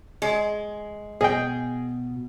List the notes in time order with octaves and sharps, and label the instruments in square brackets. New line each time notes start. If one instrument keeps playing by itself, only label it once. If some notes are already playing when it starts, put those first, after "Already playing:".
[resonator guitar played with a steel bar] G#3
[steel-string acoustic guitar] B2 [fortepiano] G#4 D#5 G5